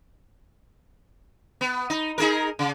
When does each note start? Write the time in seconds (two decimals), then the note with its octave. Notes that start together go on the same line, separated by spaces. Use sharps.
1.61 B3
1.90 D#4
2.18 D#4 G#4 A#4
2.59 C#3